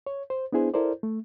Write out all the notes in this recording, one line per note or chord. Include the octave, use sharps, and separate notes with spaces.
C#5
C5
B3 D4 E4 G#4 C5
E4 A4 A#4 C5 D5
A3